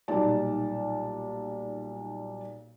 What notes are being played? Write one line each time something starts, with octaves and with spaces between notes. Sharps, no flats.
B1 A#2 G3 D#4 D5 A5